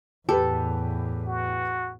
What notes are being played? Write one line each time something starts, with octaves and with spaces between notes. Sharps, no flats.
E2 A2 G4 A4 B4
F#4